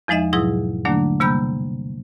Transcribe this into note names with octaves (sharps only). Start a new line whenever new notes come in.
E2 F3 G#3 D#4 D#5 E5
G#2 B2 F#3 E4 G#4 D#6
D3 F#3 A3 A#3 D4
C3 G3 A#3 B5 E6 G6